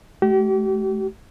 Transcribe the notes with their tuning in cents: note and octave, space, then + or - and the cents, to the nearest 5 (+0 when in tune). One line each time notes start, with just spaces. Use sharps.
A3 -40 G4 -40